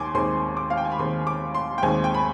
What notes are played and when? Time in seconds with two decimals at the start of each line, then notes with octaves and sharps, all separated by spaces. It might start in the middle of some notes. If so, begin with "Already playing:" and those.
Already playing: D#2 D#3 G#5 C6 D6
0.14 D#2 D#3 G#3 C4 C6
0.57 D6
0.70 F5
0.77 G5
0.85 G#5
0.92 B5
0.99 D#2 D#3 G#3 C4 C6
1.27 D6
1.55 C6
1.78 G5
1.83 D#2 D#3 G#3 C4 G#5
2.04 G5
2.14 B5